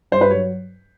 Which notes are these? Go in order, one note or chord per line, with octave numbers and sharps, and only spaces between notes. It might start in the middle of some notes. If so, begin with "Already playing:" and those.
G2 C5
B4
F#3 C#5